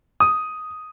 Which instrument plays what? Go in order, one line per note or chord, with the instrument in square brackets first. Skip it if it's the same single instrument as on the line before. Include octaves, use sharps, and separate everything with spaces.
[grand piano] D#6